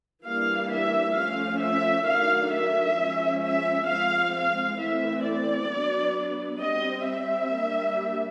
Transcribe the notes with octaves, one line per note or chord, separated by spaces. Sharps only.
E3 G3 A#3 D4 F5
E5
F3 A3 C#4 F5
E5
D#3 F#3 A3 D4 F5
E5
F3 G#3 C#4
E5
F3 G#3 C4 F5
F5
E3 A3 C4 E5
D5
F#3 B3 D4
G3 C4 D#5
E5
G3 A#3 D4